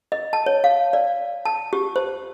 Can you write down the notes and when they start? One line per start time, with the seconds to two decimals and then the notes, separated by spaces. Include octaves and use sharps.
0.12 D#5
0.33 A5
0.46 C#5
0.64 F5
0.93 D5
1.45 A5
1.73 G4
1.96 C5